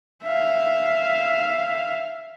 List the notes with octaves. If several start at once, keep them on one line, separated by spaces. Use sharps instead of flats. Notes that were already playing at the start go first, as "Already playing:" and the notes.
E5 F5